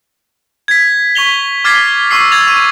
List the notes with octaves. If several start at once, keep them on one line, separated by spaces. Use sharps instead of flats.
G#6 B6
C#6 B6 F7 G7
D6 F6 G#6 A6 B6 C7
C#6 E6 C7
G#6 A6 F7
C#6 D#7